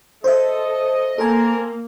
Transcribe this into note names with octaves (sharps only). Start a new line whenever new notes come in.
A4 C5 D#5 E5
A#3 C4 A4 A#4 G#5